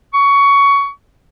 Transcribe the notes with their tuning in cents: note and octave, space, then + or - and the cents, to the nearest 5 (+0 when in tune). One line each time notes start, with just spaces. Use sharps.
C#6 +15